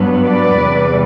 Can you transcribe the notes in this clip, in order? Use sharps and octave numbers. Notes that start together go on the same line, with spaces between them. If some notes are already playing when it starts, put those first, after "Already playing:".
Already playing: G2 F#3 B3
B4 D5
E2 C3 G3